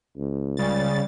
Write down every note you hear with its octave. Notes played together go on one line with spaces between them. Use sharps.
C#2
C#3 G3 A6